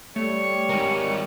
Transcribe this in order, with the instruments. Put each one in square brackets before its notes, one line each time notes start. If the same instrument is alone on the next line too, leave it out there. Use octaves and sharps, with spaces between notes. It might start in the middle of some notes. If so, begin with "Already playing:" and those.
[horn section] G3 [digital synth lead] A3 [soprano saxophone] C#5
[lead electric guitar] D#3 G#3 [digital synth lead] A#4